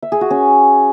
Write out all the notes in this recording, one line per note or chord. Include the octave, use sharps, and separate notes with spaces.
E5
G#4
F#4
C#4